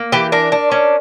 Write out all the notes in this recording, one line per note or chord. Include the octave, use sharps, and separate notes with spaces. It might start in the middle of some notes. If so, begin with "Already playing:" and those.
Already playing: A#3
E3 G4
D4 A#4
D4
C#4